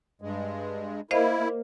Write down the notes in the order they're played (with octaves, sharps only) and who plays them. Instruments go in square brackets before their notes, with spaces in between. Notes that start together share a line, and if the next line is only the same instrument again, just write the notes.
[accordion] G2 G#3
[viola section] A#3 [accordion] E4 [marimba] C5 D#5 F5